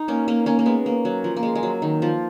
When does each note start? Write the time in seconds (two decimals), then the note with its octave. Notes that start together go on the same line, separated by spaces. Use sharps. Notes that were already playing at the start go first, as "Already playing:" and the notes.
Already playing: D#4
0.08 A#3 C#4
0.28 A#3 C#4
0.46 A#3 C#4
0.59 A#3
0.66 G#3 B3
0.86 A#3
1.05 F#3
1.24 F3
1.37 A#3
1.43 G#3
1.55 G#3
1.63 F#3
1.82 D#3
2.02 F3